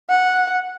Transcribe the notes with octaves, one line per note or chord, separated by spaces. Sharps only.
F#5